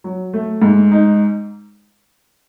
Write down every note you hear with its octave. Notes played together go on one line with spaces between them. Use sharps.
F#3
A3
G#2
D#4